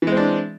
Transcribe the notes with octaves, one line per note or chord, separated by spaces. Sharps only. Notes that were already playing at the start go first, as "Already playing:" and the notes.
E3 G#3 C4 D4